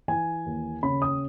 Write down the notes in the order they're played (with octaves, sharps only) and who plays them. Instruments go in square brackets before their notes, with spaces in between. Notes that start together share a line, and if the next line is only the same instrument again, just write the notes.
[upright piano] E3 G#5
D#2
C#3 B5
D#6